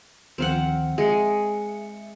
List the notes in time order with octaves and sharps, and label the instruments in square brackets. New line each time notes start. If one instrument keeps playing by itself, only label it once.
[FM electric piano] D2 D#3 F3 [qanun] C4 F5 F#5
[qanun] G#3 [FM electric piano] E5 C#7